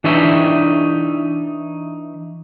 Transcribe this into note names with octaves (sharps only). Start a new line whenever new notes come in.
E3 D4 D#4 C#5 E5